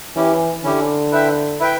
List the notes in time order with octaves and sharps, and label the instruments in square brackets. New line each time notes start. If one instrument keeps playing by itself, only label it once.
[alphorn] E3 [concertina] C#4 E4 G4
[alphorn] D3 [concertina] C#4 E4 G4
[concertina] E4 B4 E5 G5
E4 B4 E5 G5